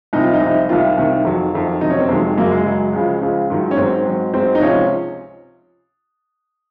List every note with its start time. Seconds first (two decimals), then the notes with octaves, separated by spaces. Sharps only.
0.13 C2 C3 F3 D#4
0.23 F4
0.33 D#4
0.40 C2 C3 F3
0.69 C2 C3 D#3 F4
0.97 C2 C3 D#3
1.25 F2 D#3 F#3
1.53 F2 D#3 F#3
1.81 F2 C3 D#3 F#3 D#4
1.90 C#4
1.99 C4
2.09 F2 C3 D#3 F#3 G#3
2.37 F#2 C#3 F#3 A#3
2.51 G#3
2.65 F#2 C#3 F#3
2.93 C#2 C#3 F3
3.21 C#2 C#3 F3
3.50 G#2 D#3 F#3
3.71 C#4
3.77 G#2 D#3 F#3 C4
4.06 G#2 F#3
4.34 G#2 F#3 C4
4.55 D#4
4.61 C#2 C3 F3 C#4